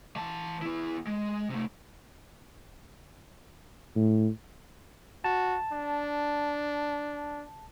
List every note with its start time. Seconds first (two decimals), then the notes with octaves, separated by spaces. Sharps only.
0.16 E3 A5
0.62 B3 E4
1.07 G#3
1.50 C3 A3
3.96 A2
5.24 F#4 A5
5.73 D4